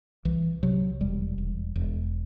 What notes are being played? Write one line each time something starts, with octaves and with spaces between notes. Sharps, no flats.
C2 E3
C3 F#3
E1 G3
E1
E1